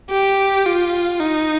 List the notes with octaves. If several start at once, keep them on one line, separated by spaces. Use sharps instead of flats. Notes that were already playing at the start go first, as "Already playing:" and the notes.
G4
F4
D#4